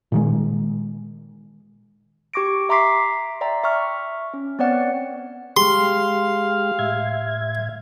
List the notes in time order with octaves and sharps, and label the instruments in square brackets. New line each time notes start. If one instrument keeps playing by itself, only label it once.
[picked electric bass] A#2 D#3 G#3
[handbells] G4 C#6 D6 A#6 D7
E5 A#5 C6 D6 B6 C7
D5 E5 G5 A#5
E5 C#6 F6
C#4
B3 C4 C#5 D5 F#5
[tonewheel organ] G#3 G4 [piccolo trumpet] F5 [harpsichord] C6
[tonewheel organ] A2 E5 G#6